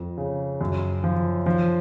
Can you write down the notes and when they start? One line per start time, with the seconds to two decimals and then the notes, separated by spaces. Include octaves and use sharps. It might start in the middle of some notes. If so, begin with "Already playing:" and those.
Already playing: F2
0.18 C#3
0.61 F#2
1.04 F3
1.46 F3